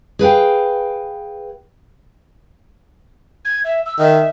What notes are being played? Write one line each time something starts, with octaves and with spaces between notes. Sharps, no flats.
G#4 B4 F5 G5
G#6
E5
E6
D#3 E5